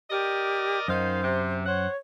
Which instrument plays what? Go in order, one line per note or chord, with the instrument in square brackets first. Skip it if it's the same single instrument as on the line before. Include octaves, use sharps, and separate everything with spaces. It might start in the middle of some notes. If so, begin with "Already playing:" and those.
[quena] G4 [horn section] A#4 D5 D#5
[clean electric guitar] F#2 [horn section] D#3 D#4 F5 [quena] C5
[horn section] C3
[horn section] C5 F#5 [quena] C#5